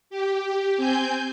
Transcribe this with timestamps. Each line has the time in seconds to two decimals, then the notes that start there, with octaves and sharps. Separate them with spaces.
0.10 G4
0.77 C4 G#5 G6